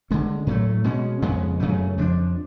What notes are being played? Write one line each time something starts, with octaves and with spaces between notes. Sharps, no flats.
D3 G#3 C#4
A2 F#3 A3
B2 G#3 C#4
F2 C#3 G#3 B3
F#2 C#3 F#3 A3
F2 F3 G#3 D4